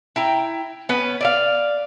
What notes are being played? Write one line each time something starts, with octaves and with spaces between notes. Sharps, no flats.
E4 G5 A#5
B3 C#4 B4
D5 E5 F5